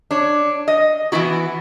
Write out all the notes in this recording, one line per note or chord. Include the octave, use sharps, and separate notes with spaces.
D4 C#5
D#5
E3 A#3 B3 E4 F#4